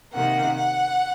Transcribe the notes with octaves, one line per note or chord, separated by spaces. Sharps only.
C3 D#3 A#3 F#5
F#5